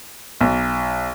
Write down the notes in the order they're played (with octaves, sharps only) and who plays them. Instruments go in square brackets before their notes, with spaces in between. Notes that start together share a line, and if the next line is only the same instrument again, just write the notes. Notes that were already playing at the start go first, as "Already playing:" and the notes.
[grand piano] B1